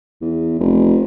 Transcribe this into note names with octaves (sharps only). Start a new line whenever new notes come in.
E2
F1